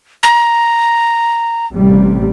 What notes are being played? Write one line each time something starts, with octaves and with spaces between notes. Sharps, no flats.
A#5
A1 C3 G3